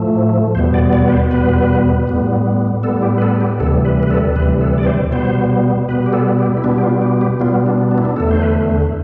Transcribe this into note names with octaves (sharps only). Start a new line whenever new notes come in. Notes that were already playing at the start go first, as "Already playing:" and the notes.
Already playing: A2 F3 A3
E2 B2 G3 B3 C5
D5
D5
B4
C5
E2 B2 G3 B3 B4
A2 G3 B3
A2 G3 B3 A4
G4
B4
A4
G4
D2 C3 E3 G3 A4
B4
B4
A4
D2 C3 E3 G3 B4
A4
D5
C5
B2 G3 B3 C5
B2 G3 B3 B4
G4
A4
G4
E4
B2 G3 B3 D4
G4
F4
G4
G4
B2 G3 B3 F4
D4
D4
E4
D4
E2 D3 A3 A4
C5
B4